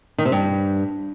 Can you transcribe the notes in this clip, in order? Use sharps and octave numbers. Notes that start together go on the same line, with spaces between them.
D#3
C3
G2